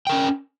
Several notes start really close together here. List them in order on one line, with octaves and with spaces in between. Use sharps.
G5 A#4 C#4